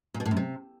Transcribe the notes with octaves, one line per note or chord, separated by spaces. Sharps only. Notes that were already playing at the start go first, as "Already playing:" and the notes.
A#2
B2
A2
F#2
C3